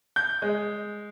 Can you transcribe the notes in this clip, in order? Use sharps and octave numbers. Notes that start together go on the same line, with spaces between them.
G6
G#3